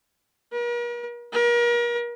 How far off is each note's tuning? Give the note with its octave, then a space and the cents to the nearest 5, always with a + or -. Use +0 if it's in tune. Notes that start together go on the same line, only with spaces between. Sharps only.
A#4 +45
A#4 +35